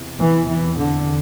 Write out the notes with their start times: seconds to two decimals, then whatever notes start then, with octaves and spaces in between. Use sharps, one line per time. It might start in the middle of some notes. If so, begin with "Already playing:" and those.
Already playing: E2 C3
0.19 E3
0.48 E3
0.79 D3